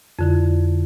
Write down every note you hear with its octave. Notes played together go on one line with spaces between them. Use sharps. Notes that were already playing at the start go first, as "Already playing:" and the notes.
F2 D3 E4